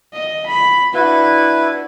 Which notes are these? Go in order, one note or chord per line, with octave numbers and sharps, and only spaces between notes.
D#5
B5
D4 E4 F#4 B4